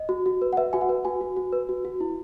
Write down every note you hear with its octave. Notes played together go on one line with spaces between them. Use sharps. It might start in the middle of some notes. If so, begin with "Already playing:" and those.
Already playing: D#5
F#4
F#4
B4
F#5
B4 E5
F#4 G#5
F#5
B4
F#4 G#5
F#4
F#4
B4
F#4
F#4
E4